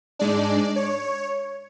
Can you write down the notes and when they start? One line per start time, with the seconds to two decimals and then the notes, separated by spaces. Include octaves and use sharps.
0.19 G#2 G#3 D4 D5
0.76 C#5